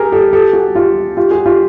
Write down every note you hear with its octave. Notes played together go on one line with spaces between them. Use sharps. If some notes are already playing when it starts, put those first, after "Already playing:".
Already playing: G4 G#4 A#4
G4 A4
G4 A4
F#4 G#4
F4 G4
F4 G4
F#4 G#4
F4 G4